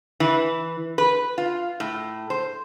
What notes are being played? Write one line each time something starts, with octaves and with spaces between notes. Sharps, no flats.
E3
B4
F4
A2
C5